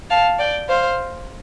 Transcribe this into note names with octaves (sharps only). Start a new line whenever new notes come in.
F5 A5
D5 G5
C5 F5